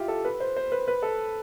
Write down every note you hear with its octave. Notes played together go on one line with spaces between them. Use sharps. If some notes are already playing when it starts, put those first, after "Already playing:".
Already playing: E4 F4 G4
A4
B4
C5
C5
B4
B4
A4